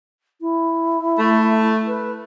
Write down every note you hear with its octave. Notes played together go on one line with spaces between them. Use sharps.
E4
A3
B4